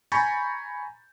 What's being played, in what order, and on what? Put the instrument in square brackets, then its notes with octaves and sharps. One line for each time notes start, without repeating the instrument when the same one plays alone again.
[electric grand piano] G#5 A#5 B5 C#6 G6 A6